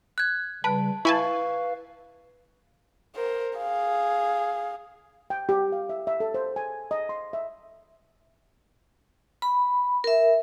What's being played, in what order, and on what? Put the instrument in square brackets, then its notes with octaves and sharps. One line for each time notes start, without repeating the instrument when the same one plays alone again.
[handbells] F#6 G#6
[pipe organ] C#3 G3 [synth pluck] B4 [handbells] A5
[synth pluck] E4 G#5 A5 [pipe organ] B4 F5 [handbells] C#6
[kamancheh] A#4 C5
G#4 F5
[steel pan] G5
G4
F5
E5
E5
A4
C5
G#5
D#5
C6
E5
[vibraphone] B5
A#4 E5